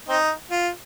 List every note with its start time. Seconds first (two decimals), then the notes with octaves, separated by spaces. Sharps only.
0.09 C4 D#4
0.51 F4